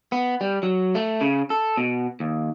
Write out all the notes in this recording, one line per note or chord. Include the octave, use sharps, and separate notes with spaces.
B3
G3
F#3
A3
C#3
A4
B2
D#2